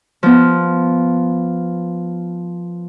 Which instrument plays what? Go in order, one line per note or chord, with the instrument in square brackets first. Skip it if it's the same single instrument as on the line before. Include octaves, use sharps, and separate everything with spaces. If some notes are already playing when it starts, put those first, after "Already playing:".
[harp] F3 B3